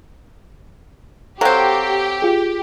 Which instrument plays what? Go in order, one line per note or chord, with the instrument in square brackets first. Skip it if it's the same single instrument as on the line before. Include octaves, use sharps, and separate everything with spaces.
[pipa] F#3 C4 [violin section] G4 [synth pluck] A4 F5
[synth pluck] F4 G#4